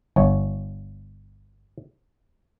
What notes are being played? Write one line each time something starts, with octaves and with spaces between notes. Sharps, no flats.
G1 C#5